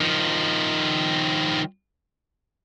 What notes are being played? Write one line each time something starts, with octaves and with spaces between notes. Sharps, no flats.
D#3 F3